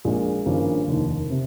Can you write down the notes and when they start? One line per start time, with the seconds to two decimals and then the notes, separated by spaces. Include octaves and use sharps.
0.04 A#1 A#2 G#3
0.46 G#1 G2 F3 A#3 C#4
0.87 F1 D#2 D#3
1.30 C3